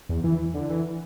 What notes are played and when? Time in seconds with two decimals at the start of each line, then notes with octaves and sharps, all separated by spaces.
0.09 E2
0.24 E3
0.54 D3
0.70 E3